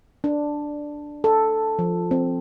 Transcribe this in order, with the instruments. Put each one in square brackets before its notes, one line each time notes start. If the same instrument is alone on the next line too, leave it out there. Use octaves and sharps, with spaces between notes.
[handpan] D4
A4
F3
C4